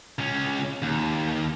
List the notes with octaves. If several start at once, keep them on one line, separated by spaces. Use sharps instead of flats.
C#2 C#4
D#2